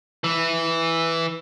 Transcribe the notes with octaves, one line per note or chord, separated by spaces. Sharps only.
E3